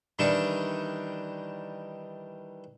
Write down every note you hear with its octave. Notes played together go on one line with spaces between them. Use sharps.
D#3 E3 G3 D4 D#4